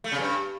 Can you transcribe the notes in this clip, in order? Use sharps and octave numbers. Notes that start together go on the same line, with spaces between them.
A3
C#3
G2